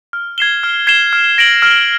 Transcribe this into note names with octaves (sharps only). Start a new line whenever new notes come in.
F6
G#6 C7 E7 G7
F6
G#6 C7 E7 G7
F6
A#6 D7 F#7
F6